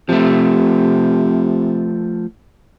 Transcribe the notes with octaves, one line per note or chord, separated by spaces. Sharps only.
C3 F3 A3